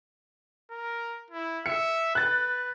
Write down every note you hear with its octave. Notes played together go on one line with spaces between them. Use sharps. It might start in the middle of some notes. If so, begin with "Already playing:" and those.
A#4
E4
E5 C#7
B4 F#6 A6